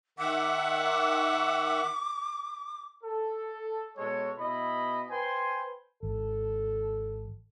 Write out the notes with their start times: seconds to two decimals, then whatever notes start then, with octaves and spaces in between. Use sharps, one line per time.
0.19 D#3 E5 F#5 D6
3.04 A4
3.97 B2 G#3 A4 C#5
4.37 B2 E4 D#5 B5
5.11 B4 C5 G5 G#5 C6
6.03 G#1 A4